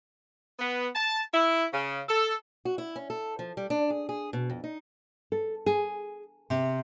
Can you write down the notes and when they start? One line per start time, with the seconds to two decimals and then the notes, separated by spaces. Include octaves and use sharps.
0.59 B3
0.94 A5
1.32 E4
1.72 C#3
2.08 A4
2.65 F#4
2.78 E4
2.96 C#4
3.10 A4
3.39 F3
3.57 G3
3.70 D4
3.90 G#4
4.09 G#4
4.33 B2
4.50 F2
4.64 D#4
5.32 A4
5.66 G#4
6.50 C3